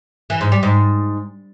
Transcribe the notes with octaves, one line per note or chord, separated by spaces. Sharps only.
E3
G#2
G3
G#2